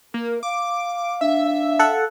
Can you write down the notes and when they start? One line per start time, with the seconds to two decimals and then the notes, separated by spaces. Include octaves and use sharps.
0.14 A#3 A#4
0.43 F5 D6
1.21 D4 E5
1.79 A4 F#5